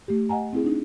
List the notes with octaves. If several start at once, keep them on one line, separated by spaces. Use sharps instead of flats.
A3 G4
D#5 F#5 G#5 A#5
C4 E4 G#4
D4 D#4